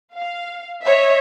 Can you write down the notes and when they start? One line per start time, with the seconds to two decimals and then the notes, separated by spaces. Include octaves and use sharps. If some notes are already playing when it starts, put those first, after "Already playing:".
0.16 F5
0.82 C#5 D#5 E5